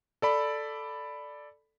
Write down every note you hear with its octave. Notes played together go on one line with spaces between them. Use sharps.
A4 D5 B5